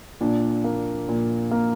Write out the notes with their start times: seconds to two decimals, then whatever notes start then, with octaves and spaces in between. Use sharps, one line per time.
0.21 A#2 D4
0.64 A#3
1.08 A#2
1.51 A#3